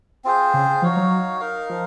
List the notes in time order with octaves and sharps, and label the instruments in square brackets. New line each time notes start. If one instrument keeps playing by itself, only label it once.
[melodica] C4 F4 G#4 C5
[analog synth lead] C#3
[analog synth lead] F3 [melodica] D#4 F#4 C#5 F5
[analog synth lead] F#3
[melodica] D#4 A#4 F5
[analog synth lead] F3